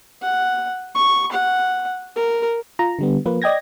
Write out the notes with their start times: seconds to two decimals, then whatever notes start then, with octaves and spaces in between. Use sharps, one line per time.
0.22 F#5
0.95 C#6
1.32 F#5
2.16 A#4
2.79 F4 A#5
2.99 D3 G3 B3
3.26 F3 A#3 B4
3.42 D5 D#5 G5 G#6 A#6